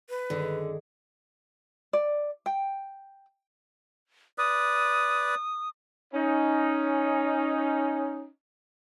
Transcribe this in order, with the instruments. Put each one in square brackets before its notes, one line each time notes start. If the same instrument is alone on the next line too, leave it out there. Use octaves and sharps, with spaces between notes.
[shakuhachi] B4
[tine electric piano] G1 D#3 [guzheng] F#2 G#3 G#4 [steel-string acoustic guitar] D3
[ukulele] D5
G5
[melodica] B4 D5 [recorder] D#6
[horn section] C#4 D#4